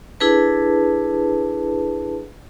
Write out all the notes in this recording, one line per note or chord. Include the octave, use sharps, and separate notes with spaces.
D4 E4 G#4 A4 B4 A5